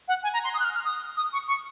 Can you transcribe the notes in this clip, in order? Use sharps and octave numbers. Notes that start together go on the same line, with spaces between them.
F#5
G#5
A#5
C6
D#6
F#6
F6
F6
D#6
D#6
C#6
C#6